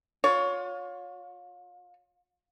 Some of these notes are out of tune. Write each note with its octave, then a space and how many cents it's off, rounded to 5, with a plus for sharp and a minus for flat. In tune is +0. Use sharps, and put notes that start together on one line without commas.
F4 +35 C#5 +15